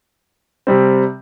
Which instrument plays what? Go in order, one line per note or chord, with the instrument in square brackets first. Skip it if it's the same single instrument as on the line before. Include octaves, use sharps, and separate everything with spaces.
[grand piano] C3 G3 C4